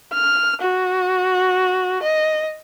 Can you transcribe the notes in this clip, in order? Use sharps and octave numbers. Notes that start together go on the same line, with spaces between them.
F6
F#4
D#5